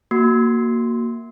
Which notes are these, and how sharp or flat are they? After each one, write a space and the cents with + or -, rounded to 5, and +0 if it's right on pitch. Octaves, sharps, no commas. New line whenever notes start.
A#3 +0 F#4 +0